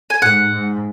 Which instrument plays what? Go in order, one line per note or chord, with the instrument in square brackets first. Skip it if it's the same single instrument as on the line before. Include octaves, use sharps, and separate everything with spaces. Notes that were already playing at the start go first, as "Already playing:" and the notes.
[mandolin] G#5
[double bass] G#2 [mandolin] F#5
[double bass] G#2